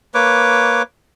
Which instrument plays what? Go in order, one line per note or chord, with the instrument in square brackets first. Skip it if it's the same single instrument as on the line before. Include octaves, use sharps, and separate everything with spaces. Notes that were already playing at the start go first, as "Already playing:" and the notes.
[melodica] A#3 B4 C#5 D6